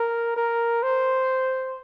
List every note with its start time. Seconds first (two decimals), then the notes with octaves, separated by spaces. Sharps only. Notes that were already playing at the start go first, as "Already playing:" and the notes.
Already playing: A#4
0.37 A#4
0.83 C5